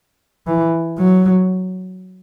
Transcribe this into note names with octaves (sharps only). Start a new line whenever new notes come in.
E3
F#3